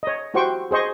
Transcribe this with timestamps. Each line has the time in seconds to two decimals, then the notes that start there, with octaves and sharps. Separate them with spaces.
0.03 C#5 D#5
0.34 E4 F#4 G4 C5 G5 C#6
0.71 G#4 C5 D#5 C#6